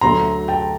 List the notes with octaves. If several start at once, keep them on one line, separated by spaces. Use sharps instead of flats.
D2 D3 F#3 A3 A#5 C6
G5 A5